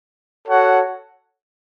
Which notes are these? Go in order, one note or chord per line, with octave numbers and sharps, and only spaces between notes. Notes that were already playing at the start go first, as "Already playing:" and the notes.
F#4 A4 C#5 F#5